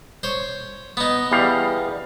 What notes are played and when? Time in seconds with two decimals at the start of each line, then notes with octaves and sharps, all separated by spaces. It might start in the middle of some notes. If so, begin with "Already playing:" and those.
0.23 C5 C#5
0.97 B3 D#4
1.32 E2 G3 F5